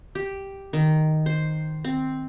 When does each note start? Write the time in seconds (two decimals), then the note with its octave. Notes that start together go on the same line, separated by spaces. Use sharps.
0.15 G4
0.73 D#3
1.26 C5
1.84 C4